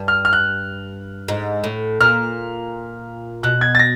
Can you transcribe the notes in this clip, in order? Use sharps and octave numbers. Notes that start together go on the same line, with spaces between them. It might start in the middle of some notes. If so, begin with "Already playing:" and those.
Already playing: G2
F6
F6
F#6
G#2
A2
A#2 F6
B2 F#6
G#6
A6
A#6